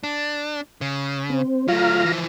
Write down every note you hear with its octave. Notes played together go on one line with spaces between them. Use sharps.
D4
C#3
C4
F#3 A3 F4 F5 A#5
E3 F3